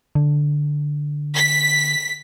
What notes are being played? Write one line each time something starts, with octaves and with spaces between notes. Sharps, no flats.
D3
B6